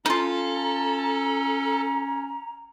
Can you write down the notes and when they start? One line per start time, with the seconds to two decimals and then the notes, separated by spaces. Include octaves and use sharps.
0.06 C#4 D#4 F4 A4 A#5